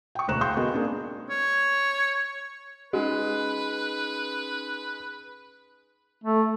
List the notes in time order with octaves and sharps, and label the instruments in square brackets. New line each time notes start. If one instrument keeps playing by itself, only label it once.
[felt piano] G5 C#6
E1 D2 C5 A#5 F#6 E7
G#4 F5 G5 C6 C#6 G6
G#3 B3 F#4 A#4 D#5
A#3 C4 D4 G#4
[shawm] C#5
[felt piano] G#3 [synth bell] C#4 D#4 [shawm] B4
[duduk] A3